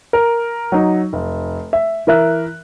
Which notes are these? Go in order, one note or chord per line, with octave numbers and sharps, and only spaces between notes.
A#4
F#3 D#4
F1
E5
E3 A#4 E5 F#6